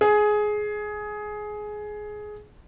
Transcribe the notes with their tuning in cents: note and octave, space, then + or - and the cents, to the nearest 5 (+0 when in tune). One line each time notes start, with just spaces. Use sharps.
G#4 +15